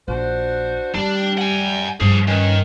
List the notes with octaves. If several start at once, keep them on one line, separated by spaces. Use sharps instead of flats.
A#1 D4 F#4 C5
D#3 G3 A3 D4
F#5 G#5
G2 F3 G#4
D#3 C#4 B4